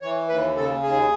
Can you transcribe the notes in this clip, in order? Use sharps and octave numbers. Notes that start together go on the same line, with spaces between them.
E3 C#5
D#2 B4
C#3 A4
D#2 G#4